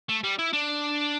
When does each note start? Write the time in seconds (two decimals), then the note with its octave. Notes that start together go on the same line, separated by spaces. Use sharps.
0.09 A3
0.24 G3
0.39 E4
0.53 D4